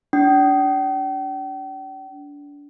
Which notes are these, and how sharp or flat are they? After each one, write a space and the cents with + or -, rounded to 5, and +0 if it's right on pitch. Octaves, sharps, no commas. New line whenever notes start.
D4 -25 G5 -40